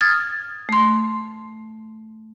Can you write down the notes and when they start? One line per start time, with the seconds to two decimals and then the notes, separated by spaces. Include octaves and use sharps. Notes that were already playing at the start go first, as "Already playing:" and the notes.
0.01 D#6 F6 G#6 A6
0.69 A3 C6